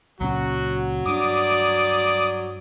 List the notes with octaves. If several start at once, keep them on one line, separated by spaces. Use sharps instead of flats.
C#2 A#2 F#3 C#4 F#4
G2 D4 D5 D6 D#6